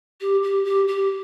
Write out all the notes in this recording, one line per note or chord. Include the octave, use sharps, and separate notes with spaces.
G4
G4
G4
G4